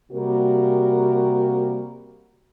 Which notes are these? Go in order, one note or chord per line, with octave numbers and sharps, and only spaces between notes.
C3 G3 A#3 F#4 A#4